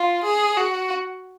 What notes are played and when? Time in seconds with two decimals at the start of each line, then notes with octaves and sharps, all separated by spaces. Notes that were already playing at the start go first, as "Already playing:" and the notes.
Already playing: F4
0.23 G#4
0.57 F#4